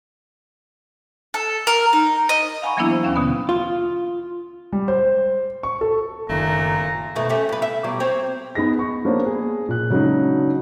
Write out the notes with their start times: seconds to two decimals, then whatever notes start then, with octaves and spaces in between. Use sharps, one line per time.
1.34 A4
1.67 A#4
1.93 D#4
2.29 D#5
2.62 F5 F#5 G#5 A#5 B5 C#6
2.77 E3 F#3 A#3 B3 D4 E4
2.90 C5
3.03 D#2 C#4 F5
3.16 B2 D3 B3
3.49 F4
4.73 G3
4.88 C5
5.63 C#6
5.81 A4
6.29 F#1 A#2 D#3 A3 A#5
7.15 G#2 B2 A3
7.29 A3 C#4 G4
7.49 G2 B4
7.62 E5
7.84 B2 F#3 G3
8.00 C4 C#5
8.55 B3 D#4 G#4 A#6
8.79 C#6
9.05 A#3 B3 D4 C5 C#5
9.26 G#4
9.68 A#2 F#6
9.90 C#3 F#3 G#3 D4 D#4